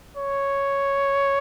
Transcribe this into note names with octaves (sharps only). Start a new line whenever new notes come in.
C#5